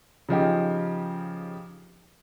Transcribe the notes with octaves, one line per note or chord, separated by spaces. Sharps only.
C#3 F3 D#4 G4